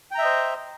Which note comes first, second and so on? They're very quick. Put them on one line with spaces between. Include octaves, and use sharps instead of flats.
G5 A#5 E5 D#5 C5